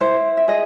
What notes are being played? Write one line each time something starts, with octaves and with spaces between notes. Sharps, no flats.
E4 C5
E5
G#4 D#5